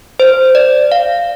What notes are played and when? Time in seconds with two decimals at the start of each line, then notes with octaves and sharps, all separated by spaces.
0.20 C5
0.55 D5
0.92 F5